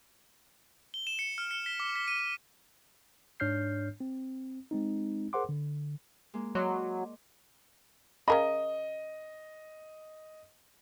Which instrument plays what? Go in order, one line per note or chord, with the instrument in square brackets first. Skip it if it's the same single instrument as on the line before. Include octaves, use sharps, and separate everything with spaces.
[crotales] G7
E7
C#7
F6
C#7
B6
D6
B6
D#7
D#7
[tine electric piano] G#2 D4 C#5 F6 G6 C7
C4
G#3 C4 D#4
G#4 A#4 C5 F#5 C6 D6
D3
[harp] G#3 A#3
[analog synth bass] F#3 [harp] D5 D#5 C6
[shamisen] C#3 A#4 B5 [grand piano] D#5